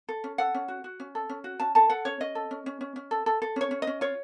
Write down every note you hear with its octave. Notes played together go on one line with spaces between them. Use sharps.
A4
C#4
A4 F#5
C#4
F#4
F#4
C#4
A4
C#4
F#4
C#4 A5
A4 A5
A4 F#5
C#4 C#5
C#4 D#5
A4
C#4
C#4
C#4
C#4
A4
A4
A4
C#4 C#5
C#4
D#5
C#4
F4 C#5